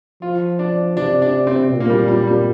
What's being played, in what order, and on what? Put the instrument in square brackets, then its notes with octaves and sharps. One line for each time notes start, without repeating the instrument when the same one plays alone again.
[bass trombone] F3 [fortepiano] F4
[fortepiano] D4
[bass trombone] C3 [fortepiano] D4
[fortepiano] D4
C4
[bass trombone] A#2
[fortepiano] A#3
G3
G3
G3